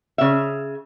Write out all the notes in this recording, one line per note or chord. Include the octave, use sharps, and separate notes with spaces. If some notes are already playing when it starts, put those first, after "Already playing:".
C#3 E5